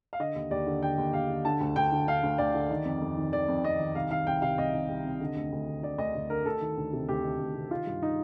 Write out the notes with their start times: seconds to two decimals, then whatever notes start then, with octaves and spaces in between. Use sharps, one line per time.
0.13 F5
0.20 D3 D#5
0.35 D#2
0.51 D#2 D5
0.67 D3
0.82 D3 G5
0.98 D#2
1.13 D#2 F5
1.29 D3
1.45 D3 A5
1.60 D2
1.76 D2 G5
1.92 D3
2.08 D3 F5
2.23 D2
2.38 D2 D5
2.55 D3
2.70 D#3
2.85 F2
3.02 F2
3.17 D#3
3.33 D#3 D5
3.48 F2
3.64 F2 D#5
3.79 D#3
3.95 C2 F5
4.11 D#3 F5
4.27 C2 G5
4.42 C3 F5
4.58 C2 D#5
4.74 D#3
4.89 C2
5.05 C3
5.20 D3
5.36 D2
5.52 D2
5.67 D3
5.83 D3 D5
5.98 D2 D#5
6.15 D2
6.30 D3 A#4
6.45 D2 A4
6.61 D#3
6.77 D2
6.93 C3
7.08 D2 G4
7.23 D#3
7.39 D2
7.55 C3
7.71 D#3 F4
7.87 G2
8.02 D#4